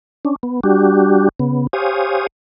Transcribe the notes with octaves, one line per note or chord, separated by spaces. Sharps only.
C#4 D4
B3
G3 D4 F#4 G4
C#3 B3
G4 C5 C#5 F5 G#5 D#6